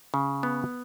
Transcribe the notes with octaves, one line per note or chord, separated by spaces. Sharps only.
C#3
B3